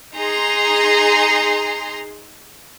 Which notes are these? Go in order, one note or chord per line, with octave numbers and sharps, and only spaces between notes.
D#4 G#4 A#5 C6